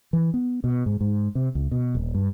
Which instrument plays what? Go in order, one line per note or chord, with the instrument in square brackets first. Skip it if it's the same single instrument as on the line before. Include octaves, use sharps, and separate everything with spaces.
[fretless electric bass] E3
B3
B2
G#2
G#2
C3
C#2
B2
D#1
G2